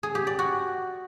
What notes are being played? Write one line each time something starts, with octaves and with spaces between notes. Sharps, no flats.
G#4
G4
D5
F#4